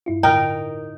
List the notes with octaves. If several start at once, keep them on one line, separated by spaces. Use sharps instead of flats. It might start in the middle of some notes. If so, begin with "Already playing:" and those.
G2 E4 F4
E2 A2 D3 D#4 A#4 G5